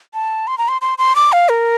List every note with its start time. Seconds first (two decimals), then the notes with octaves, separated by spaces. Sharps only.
0.14 A5
0.47 C6
0.58 A#5
0.68 C6
0.82 C6
0.98 C6
1.16 D6
1.32 F5
1.49 A#4